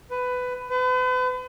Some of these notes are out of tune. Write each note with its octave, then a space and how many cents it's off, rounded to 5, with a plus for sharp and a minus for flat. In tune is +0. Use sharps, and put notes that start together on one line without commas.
B4 +15
B4 +40